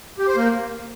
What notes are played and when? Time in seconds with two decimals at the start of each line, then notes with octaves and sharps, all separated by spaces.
0.18 G4
0.27 C5
0.36 A#3